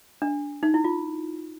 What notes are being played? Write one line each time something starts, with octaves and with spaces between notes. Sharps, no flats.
D4
D#4
E4
F4